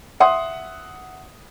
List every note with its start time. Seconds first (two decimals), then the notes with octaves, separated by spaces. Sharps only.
0.20 E5 F#5 C6 D#6